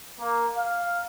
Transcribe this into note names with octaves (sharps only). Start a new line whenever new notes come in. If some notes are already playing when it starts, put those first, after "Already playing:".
A#3
F5